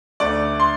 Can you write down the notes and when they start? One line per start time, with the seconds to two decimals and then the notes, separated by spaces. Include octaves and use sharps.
0.20 D2 D3 A3 D5 D6
0.60 C6